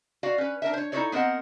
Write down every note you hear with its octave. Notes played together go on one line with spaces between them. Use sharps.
F#4 D5 F5
C#4 B4
D4 A#4 E5
C5 C#5
D#4 E4 G#4 A4 C#5 D5
B3 C4 A#4 D#5 F#5